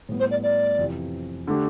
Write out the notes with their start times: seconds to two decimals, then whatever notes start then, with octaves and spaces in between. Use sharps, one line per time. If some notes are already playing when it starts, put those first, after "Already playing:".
0.09 A2 G3 B3
0.20 C5
0.31 D5
0.43 D5
0.78 F2 C3 E3
1.47 D3 A3 D4 G4